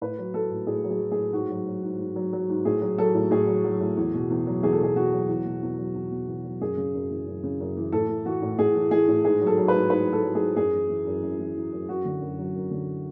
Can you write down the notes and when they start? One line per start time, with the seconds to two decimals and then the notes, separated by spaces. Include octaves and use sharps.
0.01 A2 B4
0.18 F#3
0.34 F#3 A4
0.51 A2
0.67 A2 G#4
0.84 F#3
0.90 G#4
1.00 F#3
1.11 G#4
1.17 A2
1.33 G#2 F#4
1.50 F#3
1.67 F#3
1.83 G#2
1.99 G#2
2.16 F#3
2.33 F#3
2.49 G#2
2.65 A2 G#4
2.82 F#3
2.98 F#3 A4
3.15 A2
3.31 A2 G#4
3.47 F#3
3.64 F#3
3.80 A2
3.97 E2
4.14 B2
4.30 E2
4.47 F#3
4.63 E2 G#4
4.72 A4
4.80 B2 G#4
4.96 E2 F#4
5.13 F#3
5.29 E2
5.45 B2
5.63 E2
5.78 F#3
5.94 E2
6.11 B2
6.28 E2
6.44 F#3
6.61 F#2 G#4
6.77 C#3
6.94 F#2
7.10 E3
7.27 F#2
7.43 C#3
7.60 F#2
7.77 E3
7.92 A2 A4
8.09 E3
8.25 E3 F#4
8.42 A2
8.59 A2 G#4
8.75 E3
8.91 E3 G#4
9.08 A2
9.25 G#2 G#4
9.41 F#3
9.47 A4
9.58 F#3
9.68 B4
9.74 G#2
9.90 G#2 B4
10.07 F#3
10.13 A4
10.24 F#3
10.35 G#4
10.41 G#2
10.57 F#2 G#4
10.74 E3
10.89 E3
11.07 F#2
11.22 F#2
11.39 E3
11.56 E3
11.73 F#2
11.88 F#2 F#4
12.05 D3
12.21 F#2
12.39 F#3
12.55 F#2
12.71 D3